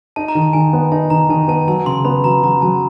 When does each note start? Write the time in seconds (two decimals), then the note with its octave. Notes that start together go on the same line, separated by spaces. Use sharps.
0.16 D#4 A5
0.28 A#5
0.35 D#3
0.42 A5
0.53 D#3 G#5
0.73 B3
0.92 D#4 A5
1.10 D#3 A#5
1.29 D#3 A5
1.48 B3 A5
1.68 F#3 A5
1.86 C#3 C6
2.05 B3 B5
2.24 F#3 A#5
2.43 F#3 A#5
2.62 F#3 A5